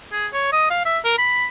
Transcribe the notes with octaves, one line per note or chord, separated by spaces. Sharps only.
G#4
C#5
D#5
F5
E5
A#4
B5